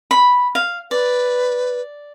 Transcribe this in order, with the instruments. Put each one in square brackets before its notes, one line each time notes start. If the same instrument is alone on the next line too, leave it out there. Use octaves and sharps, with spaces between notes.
[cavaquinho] B5
F5
[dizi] B4 [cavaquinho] D5